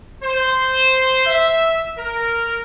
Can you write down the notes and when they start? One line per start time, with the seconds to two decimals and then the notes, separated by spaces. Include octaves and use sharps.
0.23 C5
1.25 E5
1.97 A#4